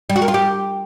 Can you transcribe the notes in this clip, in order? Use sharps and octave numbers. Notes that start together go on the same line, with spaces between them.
G3
F#4
A#4
F4
G4